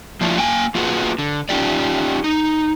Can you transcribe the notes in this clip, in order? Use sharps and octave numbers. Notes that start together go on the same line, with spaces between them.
F3 A#3 D4 E4 F4
A#3 G5 G#5
A#3 F4 F#4 G#4 A4 B4
D3
C#4 D#4 F4 G4 D5
D#4